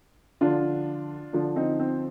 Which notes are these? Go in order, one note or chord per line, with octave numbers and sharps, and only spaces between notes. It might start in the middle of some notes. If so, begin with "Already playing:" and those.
D3 F3 D4 F4
D3 F3 D4
C4 D#4
C4